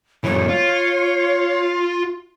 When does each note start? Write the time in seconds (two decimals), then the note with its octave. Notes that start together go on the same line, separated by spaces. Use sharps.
0.24 F#2 E3 C#5
0.49 F4